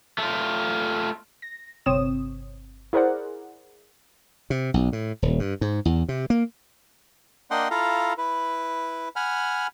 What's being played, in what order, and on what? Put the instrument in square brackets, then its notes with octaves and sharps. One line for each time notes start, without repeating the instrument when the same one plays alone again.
[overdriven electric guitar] A3 F4
[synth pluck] A#6
G1 C3 C4 C#5 D#6 E7
E4 G#4 A#4 C5 D5 F#5
[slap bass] C3
B1
A2
D#1
G2
G#2
E2
C3
A#3
[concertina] A#3 D4 D#5 F#5 G5 C6
E4 F4 A4 F5 A#5
E4 B4
F#5 G#5 B5 F6